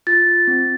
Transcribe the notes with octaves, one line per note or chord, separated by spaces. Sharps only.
F4 A6
C4